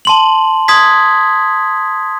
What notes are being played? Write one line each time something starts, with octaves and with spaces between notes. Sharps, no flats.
A5 C6 F#7
C6 D#6 G#6 B6